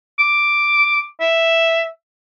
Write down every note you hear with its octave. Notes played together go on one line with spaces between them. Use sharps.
D6
E5